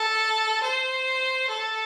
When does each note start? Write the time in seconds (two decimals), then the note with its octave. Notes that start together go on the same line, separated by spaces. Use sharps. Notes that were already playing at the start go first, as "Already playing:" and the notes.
Already playing: A4
0.62 C5
1.49 A4